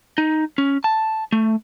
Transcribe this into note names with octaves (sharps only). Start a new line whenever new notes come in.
D#4
C#4
A5
A3